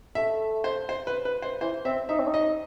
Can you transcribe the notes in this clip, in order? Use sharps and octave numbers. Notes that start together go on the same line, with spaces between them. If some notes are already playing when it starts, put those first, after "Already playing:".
A3 E5
C5
C5
B4
B4
C5
E3 C5
C4 E5
D#4 E5
C4
D#4
D#5